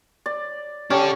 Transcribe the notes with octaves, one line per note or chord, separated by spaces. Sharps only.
D5
C#4 D4 G4 A4